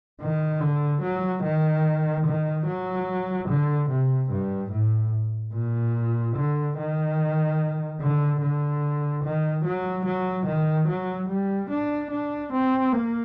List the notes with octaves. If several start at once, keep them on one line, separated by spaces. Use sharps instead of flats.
D#3
D3
F#3
D#3
D#3
F#3
D3
C3
G2
A2
A#2
D3
D#3
D3
D3
D#3
F#3
F#3
D#3
F#3
G3
D4
D4
C4
A#3